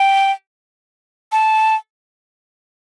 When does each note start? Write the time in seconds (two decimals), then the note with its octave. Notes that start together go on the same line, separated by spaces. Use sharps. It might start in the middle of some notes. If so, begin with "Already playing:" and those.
Already playing: G5
1.32 A5